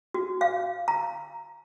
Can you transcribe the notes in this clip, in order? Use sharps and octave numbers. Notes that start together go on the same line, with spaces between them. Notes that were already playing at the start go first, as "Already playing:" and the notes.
F#4
F5
A#5